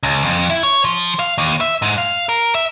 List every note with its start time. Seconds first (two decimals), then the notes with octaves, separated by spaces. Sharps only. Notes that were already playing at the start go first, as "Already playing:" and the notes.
0.03 C#2
0.25 F2
0.50 E4
0.63 C#5
0.85 F3
1.19 F5
1.38 D#2
1.61 E5
1.82 G#2
1.98 F5
2.29 A#4
2.55 E5